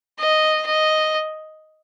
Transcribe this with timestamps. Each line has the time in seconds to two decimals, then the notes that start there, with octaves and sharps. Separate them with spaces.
0.18 D#5
0.66 D#5